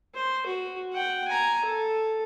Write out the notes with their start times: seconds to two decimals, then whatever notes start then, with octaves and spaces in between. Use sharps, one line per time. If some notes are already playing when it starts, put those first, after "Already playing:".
0.15 C5
0.46 F#4
0.93 F#5 G5
1.28 G#5 A#5
1.65 A4